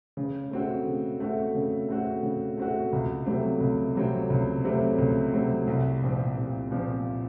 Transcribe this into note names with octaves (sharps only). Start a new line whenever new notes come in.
C#3
A3 C4 F#4
C#3
A3 C4 F#4
C#3
A3 C4 F#4
C#3
A3 C4 F#4
C#2
C3 F#3 A3 C4
C#2
C3 F#3 A3 C4
C#2
C3 F#3 A3 C4
C#2
C3 F#3 A3 C4
C2
A#2 F3 C4
C2
A#2 F3 C4